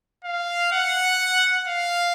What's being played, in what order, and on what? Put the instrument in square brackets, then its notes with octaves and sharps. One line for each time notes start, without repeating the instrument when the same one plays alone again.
[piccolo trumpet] F5
F#5
F5